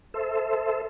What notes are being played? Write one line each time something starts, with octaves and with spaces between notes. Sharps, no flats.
A4 C5 E5